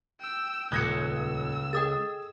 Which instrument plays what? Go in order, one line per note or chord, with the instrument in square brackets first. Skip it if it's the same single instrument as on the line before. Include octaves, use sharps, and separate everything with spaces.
[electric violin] G5 E6
[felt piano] D#1 D#6 G#6 [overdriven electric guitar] C#2 [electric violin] E6 [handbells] F#6 A#6 C#7
[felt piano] G#4 A4 D#5 [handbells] G5 D#6 A6